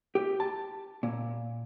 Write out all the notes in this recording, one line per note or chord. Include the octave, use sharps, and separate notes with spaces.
G4
A5
A#2